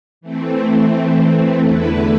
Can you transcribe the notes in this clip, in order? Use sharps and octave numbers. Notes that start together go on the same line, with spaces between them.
E3 A3 C4
E2 D3 A3 E4 B4